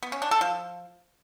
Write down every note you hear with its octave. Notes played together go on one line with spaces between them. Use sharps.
B3
C#4
D4
A4
F3